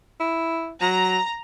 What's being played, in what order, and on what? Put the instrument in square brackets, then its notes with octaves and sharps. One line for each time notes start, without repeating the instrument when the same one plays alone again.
[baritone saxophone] E4
[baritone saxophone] F#3 [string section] A#5